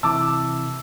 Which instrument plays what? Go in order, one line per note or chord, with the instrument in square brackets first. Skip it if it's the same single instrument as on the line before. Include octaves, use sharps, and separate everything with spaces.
[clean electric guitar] C3 E3 E4 [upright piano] A5 D6 [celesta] E6